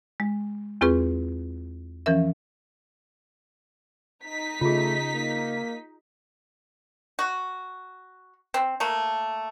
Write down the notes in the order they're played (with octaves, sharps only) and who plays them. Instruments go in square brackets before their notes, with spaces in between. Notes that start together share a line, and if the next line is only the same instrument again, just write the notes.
[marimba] G#3
E2 C4 F4 G#4 B4 C#6
E3 F3 C#4 A#4 E5
[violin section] D#4 B6
[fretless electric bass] C#3 [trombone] A3 [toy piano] F4 G#4
[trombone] A#3
[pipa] F#4
C4
A3 A#3